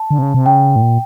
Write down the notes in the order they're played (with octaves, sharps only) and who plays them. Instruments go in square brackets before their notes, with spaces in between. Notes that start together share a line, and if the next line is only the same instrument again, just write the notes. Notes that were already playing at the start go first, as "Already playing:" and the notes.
Already playing: [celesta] A5
[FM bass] D3
C3
C#3
C3
[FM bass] C#3 [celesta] G5
[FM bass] A2
A#2